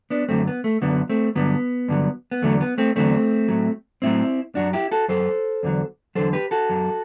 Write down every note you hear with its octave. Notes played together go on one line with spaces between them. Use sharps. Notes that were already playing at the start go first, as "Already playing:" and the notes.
B3 D4
F#2 D3 F#3 A3 C4
B3
A3
F#2 D3 F#3 B3
A3 C4
G2 D3 F#3 B3
G2 D3 F#3
B3
E2 D3 F#3 A3
B3
A3 C4
E2 D3 F#3 A3 C4
A2 F#3
A2 F#3 C4 E4
F#2 F#3 D4 F#4
E4 G4
F#4 A4
F#2 F#3 A4 C5
E2 D3 F#3
E2 D3 F#3 A4 C5
G4 B4
F#4 A4
F#2 F#3